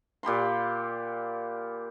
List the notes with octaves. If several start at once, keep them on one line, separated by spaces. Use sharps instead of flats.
A#2 G4 B5 C6